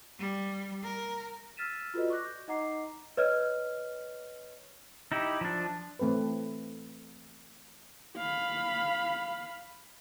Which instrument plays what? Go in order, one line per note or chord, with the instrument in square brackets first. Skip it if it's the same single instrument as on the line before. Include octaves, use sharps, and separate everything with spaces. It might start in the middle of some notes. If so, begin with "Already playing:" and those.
[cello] G3
A#4
[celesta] E6 F6 A6 B6 D#7 E7
F4 F#4 A4 B4 D5 D#5
C#6 D6 F#6 A#6
G6
D#4 D#5 F#5 A#5 D6 C7
B4 C#5 D#5 F6
[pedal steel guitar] D#4 E4 G4
F3 D4
[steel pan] E3 A3 C4 A4 B4
[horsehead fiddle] F5 B5